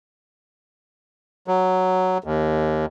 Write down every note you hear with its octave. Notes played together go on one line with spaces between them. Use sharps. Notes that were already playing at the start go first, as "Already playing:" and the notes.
F#3
D#2